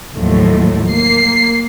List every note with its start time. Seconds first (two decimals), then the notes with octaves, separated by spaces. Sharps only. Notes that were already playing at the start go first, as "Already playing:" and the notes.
0.16 D#2 A2 F3 F#3 A3
0.88 A#3 C7